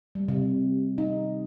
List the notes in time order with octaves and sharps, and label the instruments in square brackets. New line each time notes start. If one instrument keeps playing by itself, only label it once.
[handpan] G3
C3
D#4